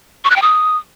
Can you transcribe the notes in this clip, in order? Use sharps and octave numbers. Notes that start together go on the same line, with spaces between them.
C#6
F#6
G5
D#6